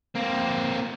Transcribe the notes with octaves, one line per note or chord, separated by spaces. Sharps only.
A#3 C4